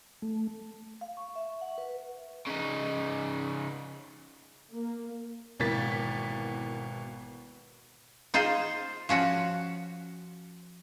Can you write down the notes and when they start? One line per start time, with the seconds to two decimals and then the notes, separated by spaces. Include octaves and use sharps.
0.22 A3
1.01 F5
1.17 C#6
1.35 E5
1.61 F#5
1.78 B4
2.47 C#3 D#4
4.74 A#3
5.60 G#1 B2 E3 A#3 A6 B6
8.34 D#4 F4 G#4 C5
9.09 F3 C#4 F#4